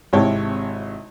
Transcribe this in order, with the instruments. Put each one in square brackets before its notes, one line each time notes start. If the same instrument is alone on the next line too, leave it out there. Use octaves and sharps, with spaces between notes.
[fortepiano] G#1 C3 E4 C#5 G5 A5